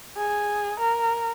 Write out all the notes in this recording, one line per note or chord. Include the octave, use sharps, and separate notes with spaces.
G#4
A#4